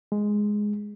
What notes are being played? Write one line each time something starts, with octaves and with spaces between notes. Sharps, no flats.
G#3